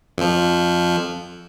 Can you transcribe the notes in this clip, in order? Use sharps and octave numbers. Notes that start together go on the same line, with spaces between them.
F2 F3